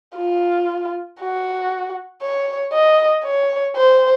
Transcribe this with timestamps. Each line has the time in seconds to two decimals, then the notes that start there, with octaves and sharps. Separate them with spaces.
0.17 F4
1.20 F#4
2.22 C#5
2.73 D#5
3.24 C#5
3.76 C5